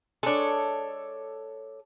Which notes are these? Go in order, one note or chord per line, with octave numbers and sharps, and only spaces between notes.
G#3 D4 A4 C#5